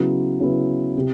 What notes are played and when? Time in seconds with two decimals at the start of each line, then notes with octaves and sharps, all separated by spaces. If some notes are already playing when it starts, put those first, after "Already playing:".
Already playing: C#3 F#3 B3 E4
0.40 C#3 F#3 B3 E4
0.98 C3